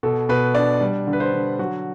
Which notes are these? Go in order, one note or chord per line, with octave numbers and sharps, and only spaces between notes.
B2 A4
B2 B4
D4 D5
G3
D3
B4
C5
D3
F#3 F#4